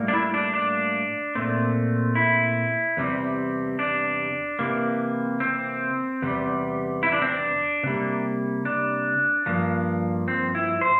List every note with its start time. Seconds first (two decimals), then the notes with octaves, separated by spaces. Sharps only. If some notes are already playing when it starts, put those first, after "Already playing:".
Already playing: A2 G3 A#3
0.08 D4
0.13 E4
0.34 D4
0.54 D4
1.35 A#2 A3 C4
2.15 E4
2.97 E2 C3 G3 C4
3.79 D4
4.59 C3 E3 A#3
5.40 C4
6.22 E2 C3 G3
7.03 E4
7.12 D4
7.22 C4
7.30 D4
7.83 C3 G3 A#3
8.65 D4
9.46 G2 F3 A#3
10.28 C4
10.55 E4
10.81 C5